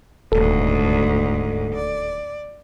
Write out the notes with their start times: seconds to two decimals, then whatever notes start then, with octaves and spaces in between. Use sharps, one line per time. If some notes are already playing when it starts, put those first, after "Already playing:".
0.32 D#1 D2 G#2 A4
1.75 D5